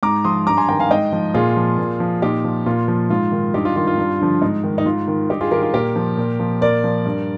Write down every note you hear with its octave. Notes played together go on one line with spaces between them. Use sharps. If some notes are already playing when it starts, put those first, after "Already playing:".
G#2 A#5 D6
F3 C6 D#6
G2 A#5 D6
G#5 C6
D#3 G5 A#5
F5 G#5
G#2 D#5 G5
F3
A#2 F4 G#4
F3
A#2
F3
A#2 D#4 G4
F3
A#2 F4
F3
G#2 F4
D#3
G2 D#4 G4
F4
D#3 F4
F4
G2
D3 F3
G#2 D#4
D#3
D#4
G#2 F4
D#3
G2 D#4 G4
F4 G#4
D#3 G4 A#4
F4
A#2 G4 A#4
F3
A#2
F3
A#2 A#4 D5
F3
G2